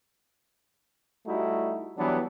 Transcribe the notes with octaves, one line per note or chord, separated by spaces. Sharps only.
G3 A3 D#4 E4 F#4
E3 F#3 G3 B3 D4